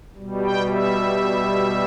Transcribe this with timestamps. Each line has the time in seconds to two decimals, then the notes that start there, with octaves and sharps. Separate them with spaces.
0.16 B2 G3
0.43 G5
0.71 E5